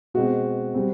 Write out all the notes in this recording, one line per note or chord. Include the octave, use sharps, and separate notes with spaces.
B2 G#3 C4 F#4
G3 C4